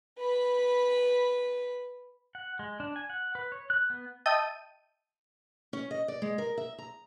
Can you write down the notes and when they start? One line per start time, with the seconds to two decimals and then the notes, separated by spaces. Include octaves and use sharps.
0.18 B4 B5
2.35 F#5
2.59 G#3
2.80 D4
2.96 G#5
3.10 F#5
3.35 B4
3.52 C#5
3.70 F#6
3.90 B3
4.26 D#5 E5 G5 A5 G6 D#7
5.73 C#4
5.91 D#5
6.08 D5
6.22 G#3
6.38 A#4
6.58 E5
6.78 A#5